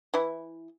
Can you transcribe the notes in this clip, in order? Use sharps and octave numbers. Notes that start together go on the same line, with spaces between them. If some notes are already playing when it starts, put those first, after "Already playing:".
E3 E4